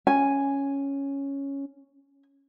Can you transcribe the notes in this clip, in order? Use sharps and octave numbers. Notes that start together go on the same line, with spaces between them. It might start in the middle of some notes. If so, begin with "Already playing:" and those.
C#4 G#5